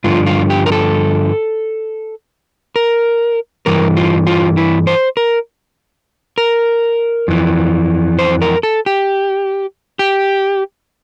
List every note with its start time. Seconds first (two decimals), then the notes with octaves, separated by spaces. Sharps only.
0.04 G2 D3 F3 F4
0.26 F4
0.50 G4
0.66 A#4
0.72 A4
2.76 A#4
3.66 G2 E3 A#4
3.97 F4
4.27 F4
4.57 E4
4.87 C5
5.17 A#4
6.38 A#4
7.28 F2 E3
8.19 C5
8.42 A#4
8.63 A4
8.86 G4
9.99 G4